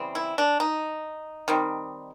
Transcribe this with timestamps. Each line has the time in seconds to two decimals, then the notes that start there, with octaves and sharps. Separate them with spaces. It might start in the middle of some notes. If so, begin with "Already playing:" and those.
Already playing: C#3 E3 G3 C4
0.15 E4
0.38 D4
0.60 D#4
1.48 D#3 G3 C4